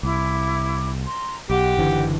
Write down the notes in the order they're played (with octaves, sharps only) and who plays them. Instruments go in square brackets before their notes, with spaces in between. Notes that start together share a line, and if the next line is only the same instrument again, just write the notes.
[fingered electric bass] C2 [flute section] E4 D6
[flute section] A#5 C6
[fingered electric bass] B1 [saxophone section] G4 [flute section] D#5 F#5
[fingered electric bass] F#1 D3 E3